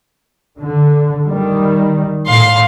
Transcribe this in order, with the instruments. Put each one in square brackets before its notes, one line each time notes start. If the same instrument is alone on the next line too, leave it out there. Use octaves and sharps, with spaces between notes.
[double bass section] D3
D#3 G3
[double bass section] A2 [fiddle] F5 C6